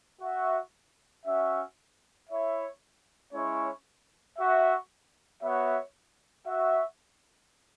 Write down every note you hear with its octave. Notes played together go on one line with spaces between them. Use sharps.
F#4 E5
C#4 F#4 E5
E4 C#5 E5
G#3 C#4 E4 C#5
F#4 E5
B3 F#4 C#5 E5
F#4 E5